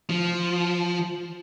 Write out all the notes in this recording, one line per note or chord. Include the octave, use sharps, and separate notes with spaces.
F3